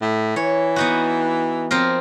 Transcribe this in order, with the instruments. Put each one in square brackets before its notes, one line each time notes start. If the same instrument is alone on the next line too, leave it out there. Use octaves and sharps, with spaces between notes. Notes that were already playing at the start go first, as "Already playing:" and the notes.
[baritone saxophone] A2
[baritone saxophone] E3 [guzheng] C#5
[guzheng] B3 D#4 F#4
F3 C4 A#4